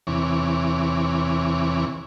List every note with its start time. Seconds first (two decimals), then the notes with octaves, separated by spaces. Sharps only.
0.07 E2 C3 E3 C#5 D6